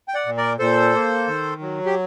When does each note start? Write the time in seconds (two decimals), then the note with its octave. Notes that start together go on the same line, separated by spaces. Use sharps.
0.08 G5
0.14 D5 F#5
0.26 A#2
0.37 A#4 D5
0.59 A#2 A4 C5
0.94 A#3
1.28 D#3
1.61 F#3
1.86 G4